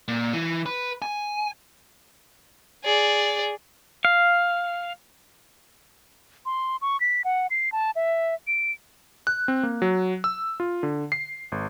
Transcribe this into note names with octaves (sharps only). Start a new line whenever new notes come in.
A#2
E3
B4
G#5
G#4 D5
F5
C6
C#6
B6
F#5
C7
A5
E5
D7
F#6
C4
A#3
F#3
E6
F4
D3
C7
G#1